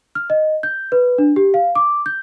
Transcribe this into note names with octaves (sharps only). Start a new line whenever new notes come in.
F6
D#5
G6
B4
D4
G4
F5
D6
G6